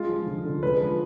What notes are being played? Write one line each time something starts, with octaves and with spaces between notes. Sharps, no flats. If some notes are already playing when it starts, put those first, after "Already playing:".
Already playing: G#3 F4
F3
D3
D3
G#3 B4
F3